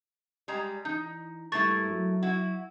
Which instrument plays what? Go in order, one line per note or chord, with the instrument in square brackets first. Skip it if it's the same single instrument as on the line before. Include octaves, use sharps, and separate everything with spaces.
[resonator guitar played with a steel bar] G3 G#3 A#5
[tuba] E3 [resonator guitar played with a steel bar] D#4 [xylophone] G6
[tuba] G2 [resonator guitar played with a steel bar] A3 A#3 E4 [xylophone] C#6 A6
[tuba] F#3
[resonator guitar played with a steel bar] E4 F#4